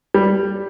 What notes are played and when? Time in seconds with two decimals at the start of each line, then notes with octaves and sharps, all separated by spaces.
0.14 G3